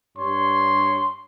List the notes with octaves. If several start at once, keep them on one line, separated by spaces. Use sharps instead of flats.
G2 C#5 C6